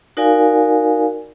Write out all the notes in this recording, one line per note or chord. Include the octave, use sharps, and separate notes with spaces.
D#4 F#4 A#4 D5 F5 G#5